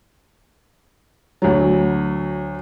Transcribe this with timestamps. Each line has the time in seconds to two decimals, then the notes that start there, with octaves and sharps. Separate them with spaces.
1.42 D2 F#3